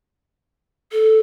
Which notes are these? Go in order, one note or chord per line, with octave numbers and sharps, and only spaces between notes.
A4